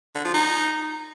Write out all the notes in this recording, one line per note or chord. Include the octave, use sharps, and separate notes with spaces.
D3
F3
D#4